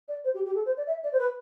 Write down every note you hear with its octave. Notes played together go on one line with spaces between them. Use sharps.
D5
C5
G4
G4
A4
C5
D5
E5
D5
C5
B4